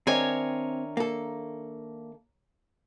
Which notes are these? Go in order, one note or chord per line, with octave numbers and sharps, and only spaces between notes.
D#3 C4 D4 A#4 C#5 E5 G#5
A#3 A4